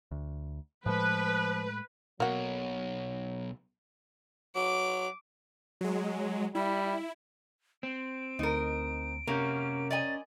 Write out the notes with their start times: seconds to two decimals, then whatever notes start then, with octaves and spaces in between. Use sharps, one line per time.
0.11 D2
0.86 A2 F3 G#3 B4
2.20 B1 B2 F#3 A#3 F#4
4.55 F#3 D6
5.81 F#3 G#3
6.55 G3 E4
7.83 C4 D7
8.39 D2 D#4 A#4
9.27 C3 A#3 C#4 A#4 G6
9.91 D5 D#5 G#5 A6